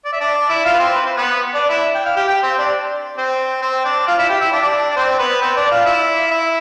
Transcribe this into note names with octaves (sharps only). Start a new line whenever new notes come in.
D5
E5
D4 D5
E4 E5
F4 F5
B4
C4 C5
B4
C5
B3 B4
D4 D5
E4 E5
G5
F5
G4 G5
G4 G5
C4 C5
D4 D5
C4 C5
C4 C5
D4 D5
F4 F5
E4 E5
G4 G5
E4 E5
D4 D5
D5
C4 C5
B3 B4
C4 C5
D4 D5
F4 F5
E4 E5
E4 E5